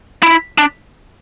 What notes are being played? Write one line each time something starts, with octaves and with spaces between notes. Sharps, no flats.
E4
D4